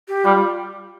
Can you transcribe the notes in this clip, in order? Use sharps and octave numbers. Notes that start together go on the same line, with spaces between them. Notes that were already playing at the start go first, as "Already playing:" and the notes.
G4
G3 F4